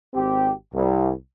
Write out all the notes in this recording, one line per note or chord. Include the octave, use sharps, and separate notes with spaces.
G#1 C4 G4
C2